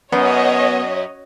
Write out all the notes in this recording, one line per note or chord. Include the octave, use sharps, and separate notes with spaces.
F#2 B3 C#5 D#5